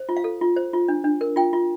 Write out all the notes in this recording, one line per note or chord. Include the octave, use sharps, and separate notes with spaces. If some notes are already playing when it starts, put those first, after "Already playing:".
Already playing: C5
F4
F5
A4
F4
C5
F4
D4
D4
A#4
F4 G5
F4